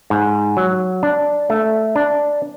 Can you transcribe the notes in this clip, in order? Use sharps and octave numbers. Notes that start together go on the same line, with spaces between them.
G#2
F#3
D4
A3
D4